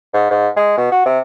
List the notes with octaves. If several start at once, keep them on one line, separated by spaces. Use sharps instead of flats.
G#2
G#2
G#3
B2
F#4
C3